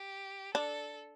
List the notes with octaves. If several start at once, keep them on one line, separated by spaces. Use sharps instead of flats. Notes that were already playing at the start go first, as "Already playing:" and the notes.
Already playing: G4
D4 A4